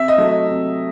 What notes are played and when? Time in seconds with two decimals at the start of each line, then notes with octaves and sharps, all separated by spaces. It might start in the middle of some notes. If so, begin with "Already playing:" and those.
Already playing: C3 E5
0.08 D#5
0.18 F#3 A3
0.29 D#5
0.50 C3